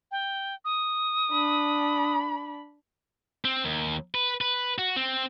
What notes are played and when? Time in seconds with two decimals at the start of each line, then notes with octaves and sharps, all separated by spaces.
0.11 G5
0.65 D#6
1.32 D4 B5
3.45 C4
3.65 D#2
4.15 B4
4.41 B4
4.78 F#4
4.97 C4